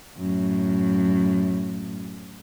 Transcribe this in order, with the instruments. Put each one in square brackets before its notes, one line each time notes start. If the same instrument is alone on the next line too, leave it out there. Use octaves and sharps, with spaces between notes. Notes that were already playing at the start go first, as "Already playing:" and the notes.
[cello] F#2 A2